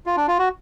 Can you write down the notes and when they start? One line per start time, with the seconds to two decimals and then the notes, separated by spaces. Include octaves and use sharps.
0.06 F4
0.17 D4
0.28 F4
0.39 F#4